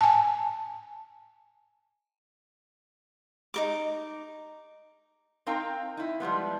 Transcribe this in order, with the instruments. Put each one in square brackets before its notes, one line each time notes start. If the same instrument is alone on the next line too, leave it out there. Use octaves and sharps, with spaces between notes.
[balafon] G#5 A5
[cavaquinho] D#4 A#4 D6
[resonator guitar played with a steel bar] C4 D#4 A#4 F5 G5 A#5
D#4 E4
F3 G3 G#3 B3